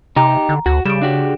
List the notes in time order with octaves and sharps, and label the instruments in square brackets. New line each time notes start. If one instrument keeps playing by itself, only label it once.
[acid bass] C3 [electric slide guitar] D#4 G4 [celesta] A#5
[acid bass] D3
[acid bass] D2 [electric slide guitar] F#4
[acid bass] C#3 [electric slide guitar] G3 [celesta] D7 E7
[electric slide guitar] D4 F#4 G4